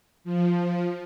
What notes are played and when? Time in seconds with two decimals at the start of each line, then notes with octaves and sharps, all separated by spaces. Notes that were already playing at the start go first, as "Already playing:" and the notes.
0.24 F3